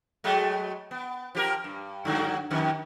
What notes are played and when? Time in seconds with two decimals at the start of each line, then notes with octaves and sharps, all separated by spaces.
0.24 F#3 G#3 A3
0.91 B3
1.35 F3 G4 A#4
1.64 G2
2.05 G2 D3 F#3
2.51 F2 D#3